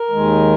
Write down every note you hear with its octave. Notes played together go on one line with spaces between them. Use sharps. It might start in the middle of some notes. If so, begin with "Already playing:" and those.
Already playing: A#4
D#2 D#3 G#3